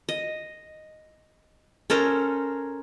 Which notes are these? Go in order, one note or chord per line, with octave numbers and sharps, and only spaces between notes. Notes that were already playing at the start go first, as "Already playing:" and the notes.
D#5
C#4 A4 A#4 C5